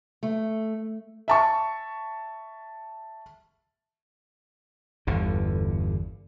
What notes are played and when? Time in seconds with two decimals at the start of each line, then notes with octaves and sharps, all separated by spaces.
0.23 A3
1.28 E5 A5 C#6
5.07 G1 E2 D3